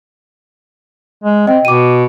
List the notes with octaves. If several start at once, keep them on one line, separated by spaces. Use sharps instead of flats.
G#3
C4 D#5 G5
B2 D6 D#7